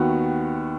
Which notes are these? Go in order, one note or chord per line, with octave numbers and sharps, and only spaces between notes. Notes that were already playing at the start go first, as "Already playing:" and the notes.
Already playing: D#2 D#3 B3 F#4